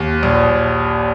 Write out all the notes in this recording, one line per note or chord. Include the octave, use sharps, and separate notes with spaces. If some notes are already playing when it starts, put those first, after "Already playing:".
Already playing: D#2
A#1